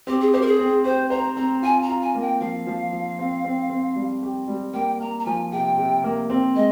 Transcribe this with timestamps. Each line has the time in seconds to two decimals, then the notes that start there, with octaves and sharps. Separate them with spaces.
0.07 C4 G4
0.20 G#4
0.33 G4 C5
0.41 A#4
0.46 G#4
0.59 C4
0.85 G4 C5
1.10 C5 A#5
1.36 C4 A#5
1.62 F4 G#5
1.82 A#5
1.89 F4
2.02 G#5
2.15 A#3
2.21 G5
2.40 F3 F5
2.67 F3
2.92 F3
3.19 C4
3.44 C4
3.70 C4
3.96 G3
4.23 G4
4.48 G3
4.73 A#3 G5
5.00 A#3 A#5
5.20 A#5
5.26 F3 G#5
5.52 C3 G5
5.78 C3
6.04 A#3
6.30 C4
6.55 G#3 D#5